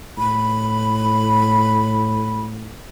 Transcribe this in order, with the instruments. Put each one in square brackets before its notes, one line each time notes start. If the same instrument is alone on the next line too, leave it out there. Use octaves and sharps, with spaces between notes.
[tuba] A2 [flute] B5